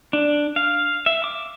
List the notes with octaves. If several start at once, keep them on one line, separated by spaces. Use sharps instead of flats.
D4
F5
E5
D6